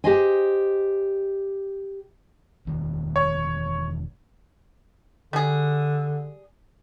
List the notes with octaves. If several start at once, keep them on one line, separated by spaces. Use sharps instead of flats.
G4 G#4 C5 D#5 G#5
E1 D#3
C#5
D3 G3 G#4